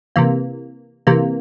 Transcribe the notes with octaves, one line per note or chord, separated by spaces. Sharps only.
C3 E3 A#3
C3 E3 A#3